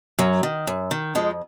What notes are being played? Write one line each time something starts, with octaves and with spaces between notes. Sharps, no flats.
F#2 F#3
D#3
F#2
D#3
F2 F3 G#3